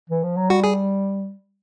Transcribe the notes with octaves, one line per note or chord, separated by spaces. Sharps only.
E3
F3
F#3
G3 F#4
G#4